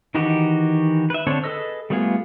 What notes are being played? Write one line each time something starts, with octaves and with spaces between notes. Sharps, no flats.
D#3 E3 D#4 F#4 G4
B4 E5
D3 C4 D4 C#5
G#4 A4 B4 D#5 E6
G3 A3 B3 F4 G#4